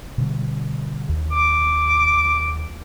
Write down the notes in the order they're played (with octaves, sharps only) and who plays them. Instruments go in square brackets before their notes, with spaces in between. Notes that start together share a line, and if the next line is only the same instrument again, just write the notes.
[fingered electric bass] B2 D3 G3
D#2
[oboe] D6